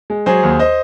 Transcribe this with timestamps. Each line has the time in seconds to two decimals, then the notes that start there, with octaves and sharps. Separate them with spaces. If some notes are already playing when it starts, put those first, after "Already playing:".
0.10 G#3
0.26 F#3 G#4 C5
0.43 D#2
0.59 C5 D#5